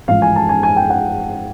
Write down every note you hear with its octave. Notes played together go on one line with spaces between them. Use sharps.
A1 G#2 F3 F5
G#5
A5
G#5
G#5
G5
F#5